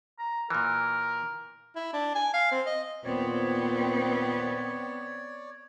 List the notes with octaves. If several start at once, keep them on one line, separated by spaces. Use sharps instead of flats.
A#5
A#2 E3 A#4
E4
D4
G#5
F5
C4
D#5
D#2 A#2 B3 C4 C#5 D5